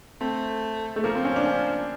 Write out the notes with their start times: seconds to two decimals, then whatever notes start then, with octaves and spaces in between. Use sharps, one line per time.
0.21 A3 C4
0.96 A3
1.04 F3 A#3
1.15 C4
1.25 C#4
1.36 D4
1.45 C#4